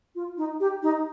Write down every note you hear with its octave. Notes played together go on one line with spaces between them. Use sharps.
F4
D#4
G4
D#4